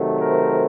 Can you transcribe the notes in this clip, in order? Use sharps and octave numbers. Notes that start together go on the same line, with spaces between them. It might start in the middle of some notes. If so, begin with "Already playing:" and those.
Already playing: C3 D#3 F#3 A3
A#4 C5